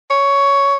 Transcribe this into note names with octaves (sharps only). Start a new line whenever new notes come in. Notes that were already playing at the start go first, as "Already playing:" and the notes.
C#5